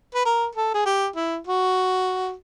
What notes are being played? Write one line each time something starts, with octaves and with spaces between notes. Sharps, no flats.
B4
A#4
A4
G#4
G4
E4
F#4